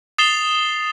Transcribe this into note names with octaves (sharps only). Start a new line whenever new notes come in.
D#6 A6 C7 E7 F7 G7